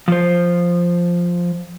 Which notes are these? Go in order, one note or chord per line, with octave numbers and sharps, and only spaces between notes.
F3 C5